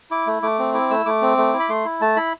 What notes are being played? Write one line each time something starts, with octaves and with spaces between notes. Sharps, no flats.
E4 D6
A3
A3 D6
C4
E4 D6
A3 E6
A3 D6
C4
A3
E4
B5
A3 C6
E4
A3 A5
E4 B5